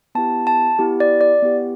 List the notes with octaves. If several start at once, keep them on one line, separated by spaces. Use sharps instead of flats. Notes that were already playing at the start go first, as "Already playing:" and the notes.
B3 E4 G4 A5
A5
B3 E4 G4
D5
D5
B3 E4 G4